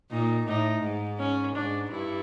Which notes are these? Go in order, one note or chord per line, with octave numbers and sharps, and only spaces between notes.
A#2 D#4
A2 D#4
G#2
C#4
G#2 D4
G2 E4